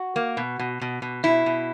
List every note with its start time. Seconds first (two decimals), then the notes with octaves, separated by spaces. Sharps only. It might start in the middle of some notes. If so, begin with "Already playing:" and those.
Already playing: F#4
0.16 A#3
0.37 B2
0.59 B2
0.81 B2
1.02 B2
1.24 B2 E4
1.46 B2